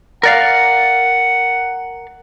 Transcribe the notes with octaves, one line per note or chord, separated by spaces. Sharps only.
A#4 D5 F5 F#5